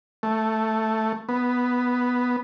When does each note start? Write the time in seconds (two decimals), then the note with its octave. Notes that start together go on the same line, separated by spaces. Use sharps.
0.23 A3
1.29 B3